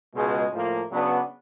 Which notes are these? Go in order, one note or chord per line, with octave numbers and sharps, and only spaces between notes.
C#2 B2 G#3
A2 F3 A#3
C#3 F#3 B3 D4